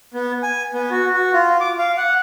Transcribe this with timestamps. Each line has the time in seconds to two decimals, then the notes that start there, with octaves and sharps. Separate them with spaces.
0.14 B3
0.43 G#5
0.74 B3
0.91 F#4
1.13 F#4
1.33 F4
1.60 D6
1.78 F5
1.97 F#5